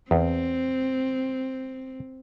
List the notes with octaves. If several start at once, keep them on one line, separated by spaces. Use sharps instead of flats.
E2 C4